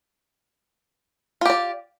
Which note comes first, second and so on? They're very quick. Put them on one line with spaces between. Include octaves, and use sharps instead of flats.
F4 G4 D5